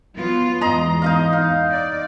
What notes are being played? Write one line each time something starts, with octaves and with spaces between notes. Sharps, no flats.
F#3 B3 F4
E2 G#2 D#5 A#5 C6
D#4 D#5 F5
F5
D5